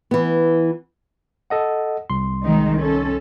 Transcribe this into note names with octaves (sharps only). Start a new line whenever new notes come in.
E3 B3
A4 D#5 F#5
C2 C6
D#3 G#3 D#4
C#4 A4